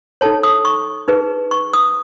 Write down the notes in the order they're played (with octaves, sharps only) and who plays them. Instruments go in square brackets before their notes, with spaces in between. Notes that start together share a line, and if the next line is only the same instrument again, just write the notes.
[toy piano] D#4 A4 C#5 A5
D#6
C#6
D#4 G#4 B4
C#6
D#6